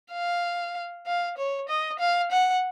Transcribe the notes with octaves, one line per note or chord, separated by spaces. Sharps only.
F5
F5
C#5
D#5
F5
F#5